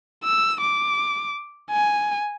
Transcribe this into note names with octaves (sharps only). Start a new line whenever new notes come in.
E6
D6
G#5